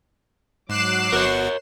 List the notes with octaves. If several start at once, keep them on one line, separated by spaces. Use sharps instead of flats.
G#2 F#3 D6 F#6 C7 E7
G1 B3 F#4 A#4 C#5